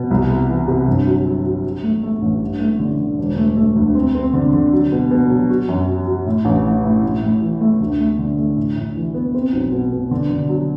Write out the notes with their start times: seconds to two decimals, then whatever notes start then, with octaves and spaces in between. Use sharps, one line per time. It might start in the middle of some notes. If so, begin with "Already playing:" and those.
Already playing: B2
0.11 C2
0.30 C3
0.49 E3
0.68 C3
0.87 G1
1.07 F#3
1.25 F#3
1.45 F#3
1.64 F#3
1.83 A3
2.03 A3
2.22 A1
2.41 G2
2.60 A3
2.79 D3
2.99 D3
3.18 E1
3.37 A3
3.57 A3
3.76 D2
3.95 C4
4.15 C4
4.33 D3
4.53 D3
4.73 F#3
4.92 B2
5.11 B2
5.30 F#3
5.50 F#4
5.69 F#2
5.88 F#3
6.07 F#3
6.26 A2
6.45 A1
6.65 A2
6.84 A2
7.03 A2
7.22 A2
7.42 E3
7.61 A3
7.80 D2
8.00 A3
8.19 D3
8.38 A3
8.57 A2
8.76 A2
8.96 E3
9.14 B3
9.34 C4
9.53 B1
9.72 B2
9.93 B2
10.11 D3
10.30 D3
10.49 F#3